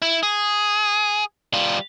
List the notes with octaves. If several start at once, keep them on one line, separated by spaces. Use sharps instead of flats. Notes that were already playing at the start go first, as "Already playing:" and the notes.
E4
G#4
G3 F4